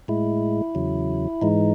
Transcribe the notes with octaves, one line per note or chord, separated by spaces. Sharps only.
A2 G#3 E4
E2 C#3 F#3
G#2 E3 G#3 D#4